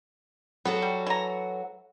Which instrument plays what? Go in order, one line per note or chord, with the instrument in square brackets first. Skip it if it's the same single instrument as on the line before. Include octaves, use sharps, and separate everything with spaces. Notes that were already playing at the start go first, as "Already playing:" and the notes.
[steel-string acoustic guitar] F#3 F#4 A4 [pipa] B3
[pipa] G3
E3 A#5